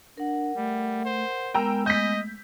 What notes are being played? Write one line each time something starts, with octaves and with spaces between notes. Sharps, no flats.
D4 A#4 F#5
G3 A3
C5
G#3 B3 A#4 G5 A#5 E6
A3 D#5 G6 B6